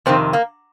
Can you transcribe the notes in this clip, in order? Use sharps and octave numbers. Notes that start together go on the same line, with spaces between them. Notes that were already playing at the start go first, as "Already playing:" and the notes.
F2 C3 D#3 C4
A#3